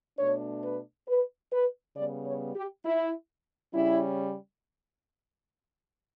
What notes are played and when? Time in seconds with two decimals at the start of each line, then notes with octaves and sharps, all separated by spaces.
0.18 B2 A3 D4 C#5
0.63 B4
1.07 B4
1.51 B4
1.96 C#3 G3 B3 D5
2.25 C#5
2.55 G4
2.84 E4
3.72 C#3 G3 C#4 E4